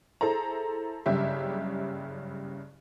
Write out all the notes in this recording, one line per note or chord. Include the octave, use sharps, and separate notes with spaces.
E4 G#4 A4 C5 A#5
F#1 G2 C#3 G4 E5